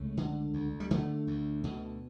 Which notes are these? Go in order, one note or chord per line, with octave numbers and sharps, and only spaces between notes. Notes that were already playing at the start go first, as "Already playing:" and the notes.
Already playing: C#2 C#3 A3
D3
D2
G3
D3 A3
D2
B2